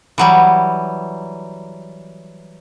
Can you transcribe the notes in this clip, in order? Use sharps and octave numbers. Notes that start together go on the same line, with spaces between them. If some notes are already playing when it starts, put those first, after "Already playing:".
E3 F#3 G3